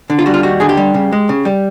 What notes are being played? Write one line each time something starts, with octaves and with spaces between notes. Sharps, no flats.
D3
F4
G3 F#4
F4
D#2 F#4
D3 G#4
G4
G3
C#3
G#3
C#3
G3